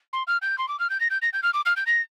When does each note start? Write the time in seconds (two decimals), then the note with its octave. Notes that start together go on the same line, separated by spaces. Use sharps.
0.13 C6
0.27 F6
0.42 G6
0.58 C6
0.68 D6
0.79 F6
0.90 G6
1.00 A#6
1.10 G6
1.22 A#6
1.33 G6
1.43 F6
1.54 D6
1.66 F6
1.76 G6
1.86 A#6